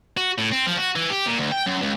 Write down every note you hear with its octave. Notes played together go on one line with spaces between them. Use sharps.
F#4
A2
C4
F3
F#4
E3
G4
A#2
D2
G5
F#2
C#2